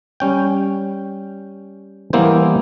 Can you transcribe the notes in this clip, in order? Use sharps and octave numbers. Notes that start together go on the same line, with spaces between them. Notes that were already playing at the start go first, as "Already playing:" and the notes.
G3 C#4 G5
E3 G3 A#3 B3 E4 C5